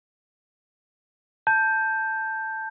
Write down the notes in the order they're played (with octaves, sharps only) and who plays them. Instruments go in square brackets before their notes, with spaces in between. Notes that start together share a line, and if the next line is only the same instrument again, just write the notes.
[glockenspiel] A5 G6